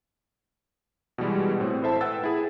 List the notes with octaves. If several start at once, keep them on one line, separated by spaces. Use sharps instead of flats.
B2 E3 G3 G#3
A2 C4
E4 A4 C5 E5 A5
B4 F#5 G5 E6 A6
E4 G#4